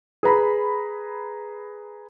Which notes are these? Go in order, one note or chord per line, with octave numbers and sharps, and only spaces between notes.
G#4 B4 A#5 B5